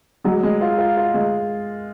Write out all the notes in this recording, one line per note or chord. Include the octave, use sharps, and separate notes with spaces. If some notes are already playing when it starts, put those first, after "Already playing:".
F#3 G#3
G#3
F4
F4
F4
G#3